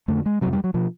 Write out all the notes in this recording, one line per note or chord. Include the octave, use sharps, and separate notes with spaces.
F2 D3 A3
G#3
F2 C3 F#3
G3
F#3
B2 F3